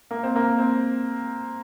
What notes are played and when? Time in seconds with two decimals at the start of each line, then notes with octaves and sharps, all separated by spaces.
0.11 A#3
0.23 C4
0.36 A#3
0.58 C4